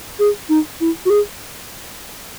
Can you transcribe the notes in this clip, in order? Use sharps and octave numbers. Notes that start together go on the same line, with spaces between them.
G#4
D#4
E4
F#4
G#4